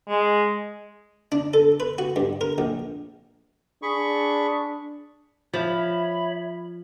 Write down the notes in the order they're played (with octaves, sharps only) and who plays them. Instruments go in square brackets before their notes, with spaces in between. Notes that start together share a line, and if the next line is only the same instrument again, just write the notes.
[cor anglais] G#3
[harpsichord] D4
A4
B4
F#4
G2
A#4
A#1
[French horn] D4 [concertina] G#4 B5 C#6
[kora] F3 [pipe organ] C#5 E5 B5